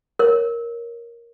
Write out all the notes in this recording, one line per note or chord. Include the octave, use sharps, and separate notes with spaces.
A#4 C#5